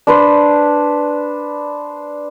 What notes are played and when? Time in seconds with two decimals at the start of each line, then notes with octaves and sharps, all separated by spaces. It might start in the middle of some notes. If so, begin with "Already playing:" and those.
0.07 D4 B4 C5